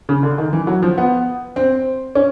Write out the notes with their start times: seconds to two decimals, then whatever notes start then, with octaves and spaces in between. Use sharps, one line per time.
0.09 C#3
0.23 D3
0.38 D#3
0.53 E3
0.67 F#3
0.83 F3
0.98 B3
1.56 C4
2.15 C#4